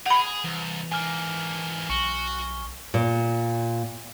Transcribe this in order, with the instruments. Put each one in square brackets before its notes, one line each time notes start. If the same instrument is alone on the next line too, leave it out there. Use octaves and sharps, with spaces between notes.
[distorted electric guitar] G#4 [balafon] F#5 B5 [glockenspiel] F7
[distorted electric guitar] C2 [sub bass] E3
[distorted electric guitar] G#2 A#3 [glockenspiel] G#5 F6
[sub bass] B1 [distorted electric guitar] F#4 [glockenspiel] C#6 G7
[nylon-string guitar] A#2